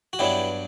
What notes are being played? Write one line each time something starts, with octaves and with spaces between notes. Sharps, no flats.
F#4
G2 F#3 B3 D4 E4 G4